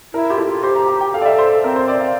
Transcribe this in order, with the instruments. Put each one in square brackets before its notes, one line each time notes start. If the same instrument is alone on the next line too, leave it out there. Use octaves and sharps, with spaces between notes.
[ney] E4 [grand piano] A#4
[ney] F4 [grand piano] G4
[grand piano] A4
[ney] F4
[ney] G4 [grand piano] C5
[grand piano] A#5
A#5
G5
[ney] A4 [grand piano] F5
[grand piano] D5
E5
C5
[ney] C4 [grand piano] A#4
[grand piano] C5
D5
F5